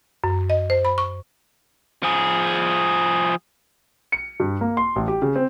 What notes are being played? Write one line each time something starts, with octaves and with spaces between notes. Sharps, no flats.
F#2
D#5
C5
B5
C#6
F3 G#4
C#7
G2
A#3
C6
A1
G4
C#3
C4